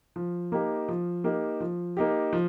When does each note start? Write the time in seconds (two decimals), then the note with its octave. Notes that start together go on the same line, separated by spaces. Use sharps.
0.16 F3
0.52 A#3 D#4 G4
0.88 F3
1.24 A#3 D#4 G4
1.60 F3
1.97 A#3 D#4 G4
2.33 F3